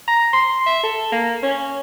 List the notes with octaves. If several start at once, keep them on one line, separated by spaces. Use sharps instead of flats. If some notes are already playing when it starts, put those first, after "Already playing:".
A#5
C6
E5
A4
A#3
C#4